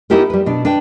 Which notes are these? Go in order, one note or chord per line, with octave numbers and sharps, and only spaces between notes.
B3 D#4 E4 G4 G#4 A#4
G3 B4
B2 D4
D4 B4 G5